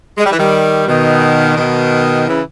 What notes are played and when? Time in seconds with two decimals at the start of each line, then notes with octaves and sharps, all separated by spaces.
0.18 G#3
0.25 G3
0.32 E3
0.39 D#3 G3
0.87 B2 D#3
1.57 B2 D#3
2.27 C#3 E3